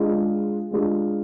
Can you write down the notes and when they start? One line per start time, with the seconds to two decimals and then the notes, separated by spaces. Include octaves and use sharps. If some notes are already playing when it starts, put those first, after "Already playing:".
Already playing: G#3 D4 F4 G#4
0.71 G#3 D4 F4 G#4